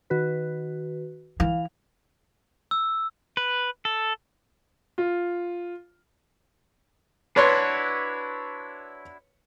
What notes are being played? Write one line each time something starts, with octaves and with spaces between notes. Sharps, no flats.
D#3 F#4 B4
E3 F5
E6
B4
A4
F4
D4 E4 F#4 B4 C#5 C6